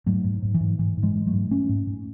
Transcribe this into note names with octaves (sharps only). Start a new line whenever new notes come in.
G#2 F#3 A3
G#2
G#2
E3
G#2
G#2 E3
G#2
E3 G#3
G#2
F#3 A3
G#2
G#2 A3 C#4
G#2
G#2